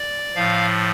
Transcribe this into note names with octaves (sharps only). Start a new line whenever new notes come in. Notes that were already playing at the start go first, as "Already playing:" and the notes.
Already playing: D5
A2 F3 F5